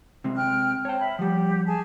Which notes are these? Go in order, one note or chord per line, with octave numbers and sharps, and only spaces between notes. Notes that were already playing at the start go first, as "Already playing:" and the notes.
C3 G#3 C4
G5 F6 F#6
C5 C#5 G5 A5
E5 B5
F3 G3 G4 F#5
G#4 G#5 A5